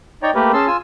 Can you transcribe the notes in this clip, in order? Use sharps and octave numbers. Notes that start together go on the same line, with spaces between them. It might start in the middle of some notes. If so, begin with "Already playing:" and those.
D#4 C#5 D5 G5 A#5
A3 A#3 G4 A#4 B4
C#4 G#4 A5 C6 E6
F4 G#5 E6